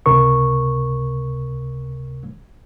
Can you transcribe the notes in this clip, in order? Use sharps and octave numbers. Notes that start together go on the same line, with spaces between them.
C#2 C3 A#4 C#6